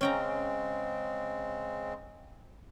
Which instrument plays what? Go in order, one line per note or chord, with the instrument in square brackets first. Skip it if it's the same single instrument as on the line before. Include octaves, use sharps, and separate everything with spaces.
[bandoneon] C#3 G#3 C4 [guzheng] C#4 G5 A#5